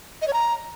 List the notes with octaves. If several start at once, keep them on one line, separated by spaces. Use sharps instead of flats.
D#5
C#5
A#5